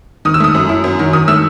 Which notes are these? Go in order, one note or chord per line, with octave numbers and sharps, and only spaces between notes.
D#3 D#6
E6
A3 D#6
F#2
E4
F#2
D#3
D#3 D#6
A3 E6